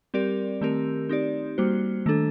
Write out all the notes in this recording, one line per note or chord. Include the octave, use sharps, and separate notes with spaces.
G3 C4 G4 A#4 D5
D#3 A3 C4 G4 A#4
C4 D#4 G4 D5
G3 A#3 F#4 C5
D#3 A3 D4 A4